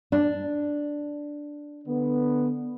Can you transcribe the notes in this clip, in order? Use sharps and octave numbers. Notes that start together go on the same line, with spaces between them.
D4
D3 B3